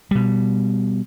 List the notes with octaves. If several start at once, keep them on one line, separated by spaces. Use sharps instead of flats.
B2 G3